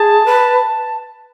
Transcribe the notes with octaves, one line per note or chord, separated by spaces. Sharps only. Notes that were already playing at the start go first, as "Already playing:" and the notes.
Already playing: G#4 A5
B4